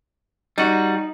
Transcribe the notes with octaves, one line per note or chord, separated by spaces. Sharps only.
G3 D#4 F#4